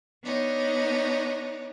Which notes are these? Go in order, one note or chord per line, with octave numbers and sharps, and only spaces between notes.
B3 D4 D#4 C#5